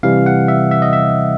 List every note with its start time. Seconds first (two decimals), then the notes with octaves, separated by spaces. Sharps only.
0.03 C3 E3 G3 F5
0.26 F#5
0.48 E5
0.71 E5
0.82 D#5
0.93 E5